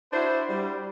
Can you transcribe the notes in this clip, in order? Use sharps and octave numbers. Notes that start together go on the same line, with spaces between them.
D4 E4 F#4 C5
G3